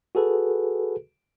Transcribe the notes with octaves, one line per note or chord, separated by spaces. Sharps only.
F#4 G#4 A4 B4